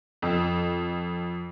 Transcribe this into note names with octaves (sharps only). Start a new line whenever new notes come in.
F2